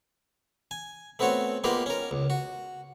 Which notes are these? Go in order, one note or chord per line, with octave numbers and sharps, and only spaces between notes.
G#5
A3 B3 C4 F#4 C#5
G#3 A#3 B3 F4 G4 A#4
C#4 A#4
C#2
F#4